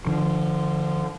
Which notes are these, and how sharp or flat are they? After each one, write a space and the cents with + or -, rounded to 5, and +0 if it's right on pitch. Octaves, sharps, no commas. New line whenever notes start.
D3 +20 F3 -20